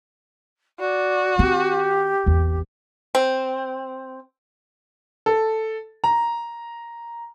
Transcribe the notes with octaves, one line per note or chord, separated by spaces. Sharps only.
F#4 D5
D#3 C4 G4
G#1 E2
C4
A4
A#5